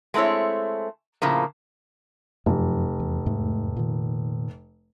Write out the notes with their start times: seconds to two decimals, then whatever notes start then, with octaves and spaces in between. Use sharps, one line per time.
0.14 G#3 A3 C4 E4 C#5
1.22 A2 C#3 F3 A#3
2.46 F1 F#2 F3
3.00 E2
3.26 E2 G#2 A3
3.77 A#2 D#3